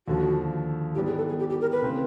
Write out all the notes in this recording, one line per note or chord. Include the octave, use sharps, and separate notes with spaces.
D#2 D3 F3 F#4
G#2 E3 G3 B3 G4
G#4
A4
G#4
G4
G4
A#4
B4
C#3 E3 A3 C4